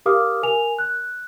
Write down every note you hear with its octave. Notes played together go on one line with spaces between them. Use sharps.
G4 A#4 F5 D6 D#6 F6
A#4 G#5 F7
F#6